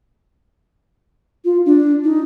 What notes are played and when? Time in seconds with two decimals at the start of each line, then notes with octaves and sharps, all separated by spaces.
1.45 F4
1.65 D4
2.04 D#4